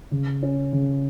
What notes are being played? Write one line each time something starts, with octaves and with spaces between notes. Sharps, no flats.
C#3
C#4
C#3